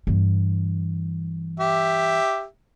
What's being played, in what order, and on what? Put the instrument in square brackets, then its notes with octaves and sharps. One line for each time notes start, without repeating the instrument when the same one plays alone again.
[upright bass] G2 E3
[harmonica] G4 E5